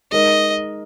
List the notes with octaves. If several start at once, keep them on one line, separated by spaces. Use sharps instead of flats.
G#3 D#4 A#4 D#5